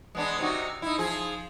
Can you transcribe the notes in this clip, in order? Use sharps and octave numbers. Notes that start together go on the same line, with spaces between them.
G#3 B3 D4
C3 D#4 F#4
D#4 E4
F3 F4 G#4